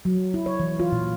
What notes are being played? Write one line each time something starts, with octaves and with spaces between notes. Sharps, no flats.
F#3
E4
C#5
E3
F4
A#2